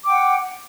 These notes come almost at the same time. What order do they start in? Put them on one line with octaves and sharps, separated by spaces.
D6 G5 F#5